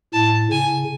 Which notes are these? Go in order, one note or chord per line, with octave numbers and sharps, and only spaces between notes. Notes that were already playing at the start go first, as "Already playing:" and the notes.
A2 A5
C#3 G#5